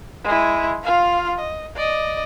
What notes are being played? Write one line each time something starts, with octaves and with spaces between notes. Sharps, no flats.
G#3 E4
F4 F5
D#5
D5 D#5